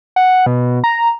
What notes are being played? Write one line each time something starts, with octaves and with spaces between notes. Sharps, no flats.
F#5
B2
A#5